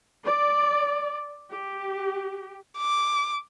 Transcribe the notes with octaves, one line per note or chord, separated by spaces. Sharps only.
D5
G4
D6